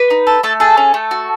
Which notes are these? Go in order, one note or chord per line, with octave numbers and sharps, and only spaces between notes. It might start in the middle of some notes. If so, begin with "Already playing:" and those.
Already playing: B4
D#4
A4
A3 A4
G#4 A4
C#4
A3
F#4